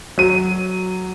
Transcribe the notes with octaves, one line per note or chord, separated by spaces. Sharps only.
F#3 D#7